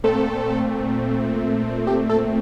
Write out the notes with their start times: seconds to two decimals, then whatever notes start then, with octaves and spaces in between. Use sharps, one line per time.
0.04 A#2 A3 C4 A4
1.87 G4
2.10 A4